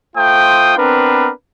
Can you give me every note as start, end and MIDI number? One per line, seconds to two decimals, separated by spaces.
0.16 0.73 57
0.16 0.73 65
0.16 0.73 72
0.16 0.73 79
0.16 0.73 87
0.76 1.30 59
0.76 1.30 60
0.76 1.30 62
0.76 1.30 70
0.76 1.30 71